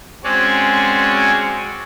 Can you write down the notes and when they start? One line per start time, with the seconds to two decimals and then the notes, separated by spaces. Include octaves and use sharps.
0.24 G#3 C4 C#4 F#4 C#5 D5